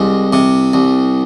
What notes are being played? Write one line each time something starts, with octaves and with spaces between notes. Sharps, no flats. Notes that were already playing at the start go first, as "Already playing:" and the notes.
Already playing: C2 G#3
C3
C2